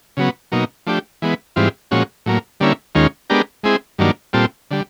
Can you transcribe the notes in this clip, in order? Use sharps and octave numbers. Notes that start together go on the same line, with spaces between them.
C#3 F#3 B3
B2 F#3 A#3 D#4
F3 A3 D4 G4
E3 G#3 B3
G#2 E3 G3 C4 F4
A#2 F3 G#3 C#4 F#4
A2 F#3 A#3
D3 G3 A#3 C#4 E4
D#2 D#3 G#3 C#4 F4
G#3 B3 D4 G4 A#4
G#3 C4 E4 G#4
G2 D#3 F#3 A#3 D4
A#2 G3 C4 F4 A4
D3 G3